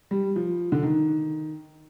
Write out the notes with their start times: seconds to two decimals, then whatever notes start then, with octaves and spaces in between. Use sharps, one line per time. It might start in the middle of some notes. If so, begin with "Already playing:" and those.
0.11 G3
0.36 F3
0.72 D3
0.83 D#3